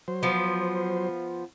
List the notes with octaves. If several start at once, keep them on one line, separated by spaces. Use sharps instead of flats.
F#3 C5
F3 B3